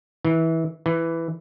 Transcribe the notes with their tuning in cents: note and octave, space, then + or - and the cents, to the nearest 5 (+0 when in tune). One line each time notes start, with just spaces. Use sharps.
E3 -20
E3 +5